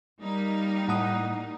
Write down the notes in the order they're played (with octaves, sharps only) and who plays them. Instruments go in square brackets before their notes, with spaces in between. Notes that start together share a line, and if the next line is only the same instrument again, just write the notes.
[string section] G3 A#3 D#4
[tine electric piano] A2 F#5 D#6